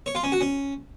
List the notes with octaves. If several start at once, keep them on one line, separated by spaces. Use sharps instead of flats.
C#5
F4
C#4
F#4
C#4